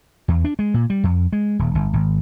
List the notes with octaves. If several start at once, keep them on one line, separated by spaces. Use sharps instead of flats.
E2
D4
G#3
A#2
G3
F2
G#3
D#1
G1
G#1